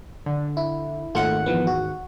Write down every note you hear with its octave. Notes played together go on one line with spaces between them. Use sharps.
D3
E4
G#1 D#2 A3 F4 F#5
E3 F3 B3
F#4